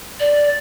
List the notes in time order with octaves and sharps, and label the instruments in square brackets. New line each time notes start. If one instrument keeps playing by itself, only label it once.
[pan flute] D5